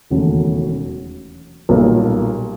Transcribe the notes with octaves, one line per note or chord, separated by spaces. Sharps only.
E1 D#2 C#3 F#3 A3
B1 A#2 G3 A#3